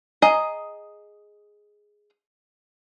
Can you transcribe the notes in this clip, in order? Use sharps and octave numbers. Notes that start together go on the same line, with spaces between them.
G#4 D#5 A#5